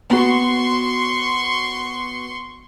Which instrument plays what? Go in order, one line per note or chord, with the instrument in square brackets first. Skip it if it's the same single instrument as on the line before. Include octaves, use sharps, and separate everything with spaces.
[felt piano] B3 F#4 [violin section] C6 C#6